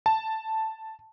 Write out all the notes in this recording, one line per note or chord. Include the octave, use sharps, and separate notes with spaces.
A5